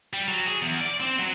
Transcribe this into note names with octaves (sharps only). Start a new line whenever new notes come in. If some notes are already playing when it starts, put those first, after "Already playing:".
G3
F#3
G#4
E2
D5
C4
F#3